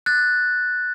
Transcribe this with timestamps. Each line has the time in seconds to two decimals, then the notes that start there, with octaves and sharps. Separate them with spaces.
0.06 F#6 A6